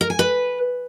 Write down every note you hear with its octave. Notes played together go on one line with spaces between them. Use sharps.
A#4
G#5
B4